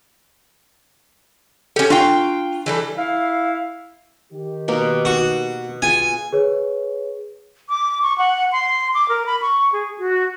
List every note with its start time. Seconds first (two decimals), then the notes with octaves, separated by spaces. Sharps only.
1.76 C#4 G4 A4
1.90 D4 F4 G5 C#6 C7
2.66 E3 G3 A4
2.97 E4 F5
4.33 D#3 G4
4.68 B2 A#3 A#4
5.05 F#4
5.82 F4 G#4 G#5
6.33 G#4 B4 C#5
7.69 D6
8.02 C#6
8.18 F#5
8.52 C6
8.94 D6
9.09 A#4
9.26 B5
9.42 C#6
9.73 G#4
9.99 F#4